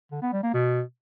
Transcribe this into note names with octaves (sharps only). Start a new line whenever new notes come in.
D3
B3
G3
A#3
B2